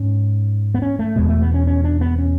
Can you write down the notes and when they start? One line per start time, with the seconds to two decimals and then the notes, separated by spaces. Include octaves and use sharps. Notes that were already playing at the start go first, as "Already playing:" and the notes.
Already playing: G#2 C#4
0.74 B3
0.82 C#4
0.99 A3
1.16 E2 B2 G#3
1.29 A3
1.42 B3
1.54 C#4
1.67 C#4
1.84 D4
2.01 B3
2.18 C#4